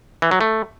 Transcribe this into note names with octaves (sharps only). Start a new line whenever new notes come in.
E3
F#3
A3